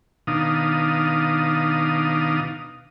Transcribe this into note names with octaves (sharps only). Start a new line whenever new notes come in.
B2 D#3 D4 D#4 F5 D#6